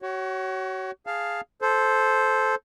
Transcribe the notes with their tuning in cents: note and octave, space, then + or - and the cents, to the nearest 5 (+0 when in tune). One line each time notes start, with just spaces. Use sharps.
F#4 +35 C#5 +0
G#4 +0 F5 +0 A5 +0
A4 -15 C5 +0